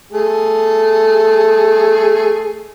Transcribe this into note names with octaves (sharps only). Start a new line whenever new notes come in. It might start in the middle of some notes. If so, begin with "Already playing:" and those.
A3 G#4